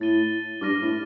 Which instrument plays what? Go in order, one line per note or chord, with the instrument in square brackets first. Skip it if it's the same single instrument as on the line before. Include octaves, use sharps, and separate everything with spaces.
[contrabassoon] A2 [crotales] A6 D#7 G7
[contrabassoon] G2 [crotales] D6 F6 A#6 D#7
[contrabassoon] A2